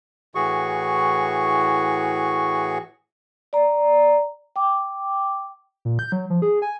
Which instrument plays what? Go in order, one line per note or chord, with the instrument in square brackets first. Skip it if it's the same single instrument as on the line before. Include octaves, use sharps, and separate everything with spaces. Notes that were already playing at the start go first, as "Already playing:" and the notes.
[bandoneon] A2 E3 F#4 G#4 C#6
[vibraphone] D5 A#5
G5 D6
[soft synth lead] A#2
G6
F#3
F3
G#4
G#5